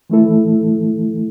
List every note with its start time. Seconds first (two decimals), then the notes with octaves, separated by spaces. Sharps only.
0.10 E3 A3 E4 A4